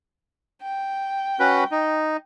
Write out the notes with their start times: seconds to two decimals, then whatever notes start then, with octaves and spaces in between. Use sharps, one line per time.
0.62 G5
1.40 C#4 F#4 B4
1.71 D#4